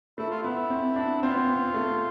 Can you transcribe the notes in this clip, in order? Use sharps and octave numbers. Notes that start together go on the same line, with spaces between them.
A3 E4
F4
B3 E4
C4
D4
C4 F4
B3
C4
B3
A3